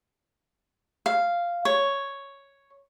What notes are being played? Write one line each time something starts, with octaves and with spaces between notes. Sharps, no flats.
F5
C#5